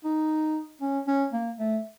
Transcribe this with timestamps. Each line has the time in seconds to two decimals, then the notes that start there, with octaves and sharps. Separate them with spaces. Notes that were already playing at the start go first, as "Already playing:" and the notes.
0.04 D#4
0.81 C#4
1.07 C#4
1.33 A#3
1.59 A3